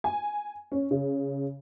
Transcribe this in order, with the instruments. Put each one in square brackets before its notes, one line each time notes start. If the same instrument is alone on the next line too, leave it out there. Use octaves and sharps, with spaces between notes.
[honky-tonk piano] G#5
C#4
C#3